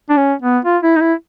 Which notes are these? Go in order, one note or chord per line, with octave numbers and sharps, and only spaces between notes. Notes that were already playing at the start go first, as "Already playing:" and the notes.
D4
C#4
B3
F4
E4
D#4
E4